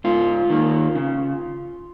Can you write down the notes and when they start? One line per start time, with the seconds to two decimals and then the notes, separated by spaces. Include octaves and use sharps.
0.04 G#2 F4
0.50 D#3 A#3
0.95 C#3